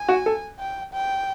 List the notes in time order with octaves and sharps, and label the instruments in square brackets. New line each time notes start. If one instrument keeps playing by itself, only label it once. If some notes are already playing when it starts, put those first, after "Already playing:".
Already playing: [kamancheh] G#5
[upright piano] F#4
A4
[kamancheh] G5
G5